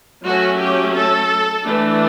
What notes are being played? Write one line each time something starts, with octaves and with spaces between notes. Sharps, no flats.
F#3 A3 C#4 F#4
G4
A4
E3 A3 D4